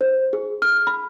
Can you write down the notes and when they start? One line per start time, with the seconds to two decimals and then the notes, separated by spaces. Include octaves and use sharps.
0.01 C5
0.33 G#4
0.62 F6
0.87 B5